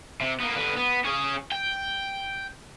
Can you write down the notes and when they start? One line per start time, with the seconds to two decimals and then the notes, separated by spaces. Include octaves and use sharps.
0.21 C3
0.40 A#3 B3
0.56 D3 B3
0.77 B3
1.05 C#4 G#4
1.52 G5